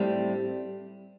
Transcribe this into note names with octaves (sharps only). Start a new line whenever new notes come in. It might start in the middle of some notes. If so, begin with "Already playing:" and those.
Already playing: A2 G3 C4